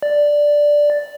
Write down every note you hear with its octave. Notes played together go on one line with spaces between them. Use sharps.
D5